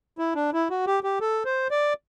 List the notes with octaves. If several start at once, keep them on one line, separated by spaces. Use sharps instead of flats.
E4
D4
E4
F#4
G4
G4
A4
C5
D5